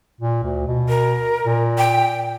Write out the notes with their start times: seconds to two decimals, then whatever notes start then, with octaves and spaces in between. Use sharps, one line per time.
0.21 A#2
0.43 D2
0.67 B2
0.89 A#4
1.44 A#2
1.78 G5